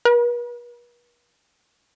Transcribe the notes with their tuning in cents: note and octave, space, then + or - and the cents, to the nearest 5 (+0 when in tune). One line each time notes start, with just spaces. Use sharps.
B4 -45